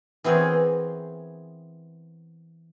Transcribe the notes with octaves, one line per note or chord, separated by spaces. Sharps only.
E3 B3 C4 G#4 A#4 C#5